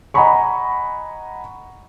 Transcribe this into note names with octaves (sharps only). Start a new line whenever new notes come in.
D#5 F#5 G#5 A#5 B5 C#6